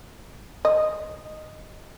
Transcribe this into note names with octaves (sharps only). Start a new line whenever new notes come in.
D#5